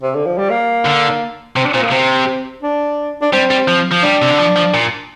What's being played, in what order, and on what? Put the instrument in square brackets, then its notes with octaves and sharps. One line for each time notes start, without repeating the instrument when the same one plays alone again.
[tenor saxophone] C3
D3
F3
G3
A#3
[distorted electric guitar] D3
[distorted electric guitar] C3 [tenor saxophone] C4
[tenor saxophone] D4
[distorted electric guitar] A#2 [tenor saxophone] C4
[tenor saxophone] A#3
[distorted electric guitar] C3 [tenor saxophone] C4
[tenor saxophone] D4
D4
[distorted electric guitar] G3 [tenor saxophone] C4
[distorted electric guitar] G3
F3
F3
[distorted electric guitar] G3 [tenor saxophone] D4
[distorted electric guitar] C3
D3
F3
F3
A#2